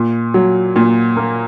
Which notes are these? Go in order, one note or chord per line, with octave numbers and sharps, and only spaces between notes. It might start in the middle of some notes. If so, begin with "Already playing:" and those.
Already playing: A#2
F#3
A#2
A#3